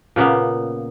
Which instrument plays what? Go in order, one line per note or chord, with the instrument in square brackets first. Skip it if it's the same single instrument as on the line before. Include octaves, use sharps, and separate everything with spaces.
[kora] A#2 C#3 A#3 B3